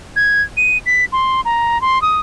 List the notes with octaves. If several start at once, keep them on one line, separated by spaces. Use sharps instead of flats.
G#6
D#7
B6
C6
A#5
C6
D#6